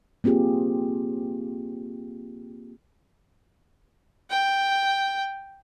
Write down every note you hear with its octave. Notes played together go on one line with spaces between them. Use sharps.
A#3 C4 F4 G4 G#4
G5